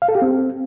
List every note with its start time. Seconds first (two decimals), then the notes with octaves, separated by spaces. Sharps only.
0.02 F5
0.09 A4
0.15 G4
0.22 C4